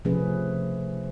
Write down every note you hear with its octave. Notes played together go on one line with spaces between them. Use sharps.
C3 F3 A3 C#4 G#4 B4